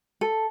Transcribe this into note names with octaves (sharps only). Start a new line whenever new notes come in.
A4